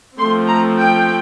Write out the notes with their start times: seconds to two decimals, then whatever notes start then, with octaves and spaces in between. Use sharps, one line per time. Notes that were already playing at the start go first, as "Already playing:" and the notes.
0.18 F3 A3 C4 C6
0.48 A#5
0.78 G5